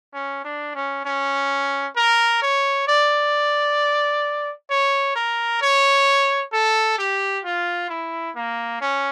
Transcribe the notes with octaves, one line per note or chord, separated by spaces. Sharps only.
C#4
D4
C#4
C#4
A#4
C#5
D5
C#5
A#4
C#5
A4
G4
F4
E4
A#3
C#4